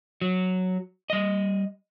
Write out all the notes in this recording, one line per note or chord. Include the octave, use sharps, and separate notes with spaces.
F#3
G3 D#5